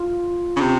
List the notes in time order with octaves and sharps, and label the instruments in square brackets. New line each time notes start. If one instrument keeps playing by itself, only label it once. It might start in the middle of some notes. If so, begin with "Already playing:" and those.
Already playing: [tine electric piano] F4
[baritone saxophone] C#3
C3